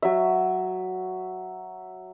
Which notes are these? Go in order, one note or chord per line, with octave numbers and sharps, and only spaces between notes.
F#3 E5